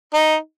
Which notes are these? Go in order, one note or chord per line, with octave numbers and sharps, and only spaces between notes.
D#4